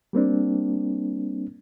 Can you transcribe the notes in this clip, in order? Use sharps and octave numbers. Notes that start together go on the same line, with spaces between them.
G3 A#3 C4 D4